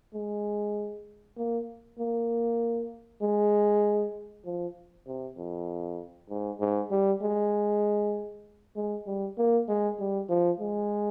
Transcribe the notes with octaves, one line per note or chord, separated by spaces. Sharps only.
G#3
A#3
A#3
G#3
F3
C3
F2
G#2
G#2
G3
G#3
G#3
G3
A#3
G#3
G3
F3
G#3